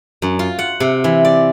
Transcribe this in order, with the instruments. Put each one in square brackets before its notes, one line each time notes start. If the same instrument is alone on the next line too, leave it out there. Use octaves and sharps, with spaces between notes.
[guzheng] F#2
F4
F#5
C3
E3
D5